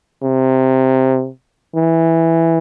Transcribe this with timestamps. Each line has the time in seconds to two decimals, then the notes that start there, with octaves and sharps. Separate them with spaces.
0.22 C3
1.75 E3